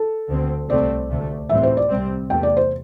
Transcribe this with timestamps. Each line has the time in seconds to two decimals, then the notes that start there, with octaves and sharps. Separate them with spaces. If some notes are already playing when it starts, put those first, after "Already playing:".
Already playing: A4
0.30 D2 D3 C4
0.69 C2 C3 A3 C4 D5
1.10 D2 C3 A3
1.49 A2 E3 G3 C4 E5
1.63 C5
1.77 D5
1.90 C2 C3 G3 C4
2.30 E2 C3 A3 G5
2.43 D5
2.57 C5